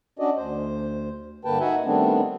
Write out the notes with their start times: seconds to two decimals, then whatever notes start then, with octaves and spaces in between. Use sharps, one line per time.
0.19 C#4 D4 F#4 D5 D#5
0.37 D2 C5
1.45 G2 D3 A#3 B4 G5 A5
1.60 D#4 F#4 E5 F#5 G#5
1.85 D#3 G3 A3 B3 C4 D4